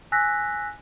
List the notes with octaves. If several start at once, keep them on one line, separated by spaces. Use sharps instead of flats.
G#5 E6 F#6 A#6 B6